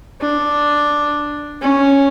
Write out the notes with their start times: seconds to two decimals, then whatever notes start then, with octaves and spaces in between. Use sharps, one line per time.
0.21 D4
1.61 C#4